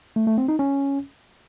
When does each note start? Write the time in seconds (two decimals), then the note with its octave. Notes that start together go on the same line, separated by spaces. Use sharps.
0.16 A3
0.27 A3
0.38 C4
0.48 D#4
0.59 C#4